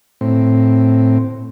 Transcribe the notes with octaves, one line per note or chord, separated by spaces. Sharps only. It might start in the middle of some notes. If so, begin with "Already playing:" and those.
A2 C4